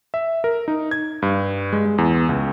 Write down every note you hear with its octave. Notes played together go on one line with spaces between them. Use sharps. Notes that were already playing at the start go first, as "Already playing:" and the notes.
E5
A#4
D#4
G#6
G2
G#3
G#3
E2
C#2